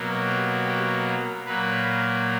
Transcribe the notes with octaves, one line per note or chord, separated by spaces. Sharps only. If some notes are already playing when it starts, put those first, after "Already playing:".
Already playing: B2 F#3 A#3
G4
G4
A#2 F#3 A#3 B4